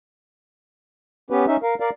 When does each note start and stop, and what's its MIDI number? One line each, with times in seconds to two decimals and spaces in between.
1.30 1.45 59
1.30 1.45 61
1.30 1.45 67
1.30 1.45 71
1.47 1.57 61
1.47 1.57 63
1.47 1.57 76
1.63 1.75 70
1.63 1.75 77
1.80 1.90 70
1.80 1.90 74
1.80 1.90 77